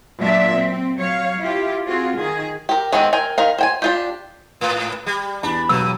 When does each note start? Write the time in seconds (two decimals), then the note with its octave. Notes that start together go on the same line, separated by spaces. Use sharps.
0.20 A#2 F#3 D4 E5
0.54 C4
0.99 F#3 C#5 F5
1.40 E4 F4 G4
1.87 C4 F4 F#4 G#4
2.17 D#3 G#4
2.69 G4 A#4
2.92 D#3 G#3 B3 C4
3.13 A#4 G5 G#5
3.38 D#3 A#4 F5
3.58 C5 G5 G#5
3.82 D4 F4 G4
4.61 G#2
5.06 G3
5.43 E2 D4 B5
5.69 E1 G2 F#3 E6